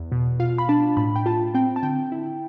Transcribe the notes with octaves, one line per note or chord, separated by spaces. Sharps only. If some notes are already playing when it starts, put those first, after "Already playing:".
Already playing: E2
B2
F4 F5
B5
D4 A5
A2 B5
G5
F4 A5
C4 G5
A5
D3 G5
E4